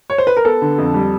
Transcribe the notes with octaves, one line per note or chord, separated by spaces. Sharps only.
C#5
C5
B4
A#4
B3 A4
D3
F2
G3